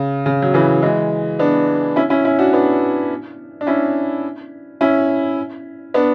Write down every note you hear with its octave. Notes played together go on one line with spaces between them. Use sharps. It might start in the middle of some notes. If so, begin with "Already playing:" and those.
Already playing: C#3
C#3
F#3
C#3 E3
E3 G#3
B3 D4
C#4 E4
C#4 E4
C#4 E4
D4 F#4
B3 D4
D4
C#4 E4
C#4 E4
B3 D4